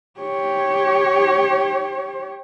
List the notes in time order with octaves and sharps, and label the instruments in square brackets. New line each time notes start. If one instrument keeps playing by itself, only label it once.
[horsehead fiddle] G4 C#5